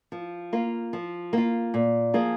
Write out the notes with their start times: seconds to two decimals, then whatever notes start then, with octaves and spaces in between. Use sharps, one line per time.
0.12 F3
0.53 A#3 F4
0.93 F3
1.33 A#3 F4
1.74 A#2
2.14 F3 A#3 F4 G#4